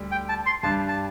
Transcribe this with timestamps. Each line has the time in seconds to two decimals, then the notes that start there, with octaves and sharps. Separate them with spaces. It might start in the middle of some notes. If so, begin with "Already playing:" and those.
Already playing: D2 G3
0.11 G5
0.29 A5
0.46 C6
0.63 G2 G3 D4 A5
0.88 A5